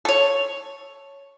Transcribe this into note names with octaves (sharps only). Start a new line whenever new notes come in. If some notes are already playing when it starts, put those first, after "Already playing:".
A4 C#5